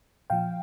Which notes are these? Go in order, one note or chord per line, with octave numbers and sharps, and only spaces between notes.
A#2 F3 F5 G5